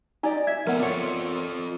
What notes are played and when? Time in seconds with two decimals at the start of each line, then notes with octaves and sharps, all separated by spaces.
0.23 D#4 G4 D5 D#5 G#5
0.47 E5 G#6
0.67 F3 B3 A4 A#4 F#5
0.80 C4 F4 A4 C#5 D5